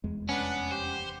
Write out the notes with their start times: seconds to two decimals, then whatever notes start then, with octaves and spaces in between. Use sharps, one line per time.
0.04 F1 E2 G#3
0.29 B3 C#4 D4 B4 F#5
0.71 G4 C5